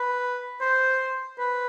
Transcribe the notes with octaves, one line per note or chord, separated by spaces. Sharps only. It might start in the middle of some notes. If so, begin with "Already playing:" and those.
Already playing: B4
C5
B4